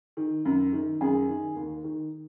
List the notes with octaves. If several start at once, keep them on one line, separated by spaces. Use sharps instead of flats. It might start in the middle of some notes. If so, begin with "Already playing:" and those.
D#3
F#2
D#3
F#2 G#4
D#3
D#2
D#3